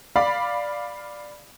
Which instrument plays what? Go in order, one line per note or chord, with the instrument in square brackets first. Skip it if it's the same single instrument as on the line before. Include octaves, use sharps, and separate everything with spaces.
[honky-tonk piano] D5 F5 B5